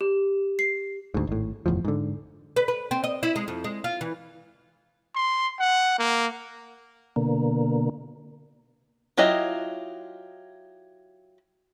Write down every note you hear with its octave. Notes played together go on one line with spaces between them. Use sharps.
G4
C7
D2 G#2
G#1 A2
F#1 E2 A2 F3
G#2 D3
B4
B4
C4
D#5
E4
G#3
F2
G#3
F4
E3
C6
F#5
A#3
B2 D3 A#3
F#3 E4 F4 G4 D#5